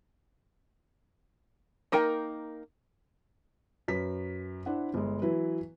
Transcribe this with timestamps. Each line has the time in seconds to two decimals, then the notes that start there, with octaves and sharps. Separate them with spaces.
1.92 A#3 D#4 A#4 G5
3.88 F#2 B4 B6
4.66 D4 E4 C5 F#5
4.94 G1 G#3
5.22 E3 F#3 E4 B4